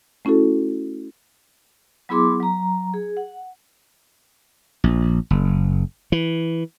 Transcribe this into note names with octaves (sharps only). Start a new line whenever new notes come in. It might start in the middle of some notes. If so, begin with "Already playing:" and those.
A3 C#4 E4 F#4 A4
F#3 B3 E4 G#4 C6 D6
F#3 A#5
G#4
F#5
A#1
F#1
E3